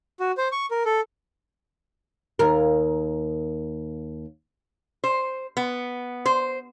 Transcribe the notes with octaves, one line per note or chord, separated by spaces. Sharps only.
F#4
C5
C#6
A#4
A4
D#2 A#4
C5
B3
C5